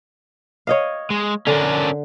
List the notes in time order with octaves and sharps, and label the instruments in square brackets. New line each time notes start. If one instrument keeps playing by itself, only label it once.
[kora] C#5 D#5 F5
[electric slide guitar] G#3
[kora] D3 [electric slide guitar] C#4 D4 A#4